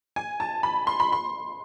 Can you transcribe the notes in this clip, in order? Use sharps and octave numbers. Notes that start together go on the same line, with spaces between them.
G#5
A5
B5
C6
B5
C6